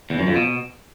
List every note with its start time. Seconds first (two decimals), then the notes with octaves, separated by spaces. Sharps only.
0.10 E2
0.19 F#2
0.27 F2
0.36 B2